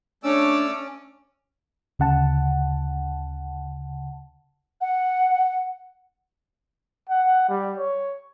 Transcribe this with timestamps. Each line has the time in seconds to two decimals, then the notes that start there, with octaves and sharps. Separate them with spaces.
0.24 A3 C#4 D4 C#5 D5 D6 E6
1.99 D2 C#3 F#5 A5
4.81 F#5
7.09 F#5
7.48 G3
7.78 C#5